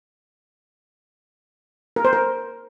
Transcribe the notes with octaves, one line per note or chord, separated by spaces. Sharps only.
A#4
C5
A#4